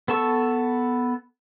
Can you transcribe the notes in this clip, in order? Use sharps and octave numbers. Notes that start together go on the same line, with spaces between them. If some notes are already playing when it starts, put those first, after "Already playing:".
B3 A4 A5 C#6 E6